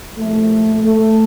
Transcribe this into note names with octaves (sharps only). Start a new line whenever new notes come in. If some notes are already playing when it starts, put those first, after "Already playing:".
C2 A#2 F3 A3
A3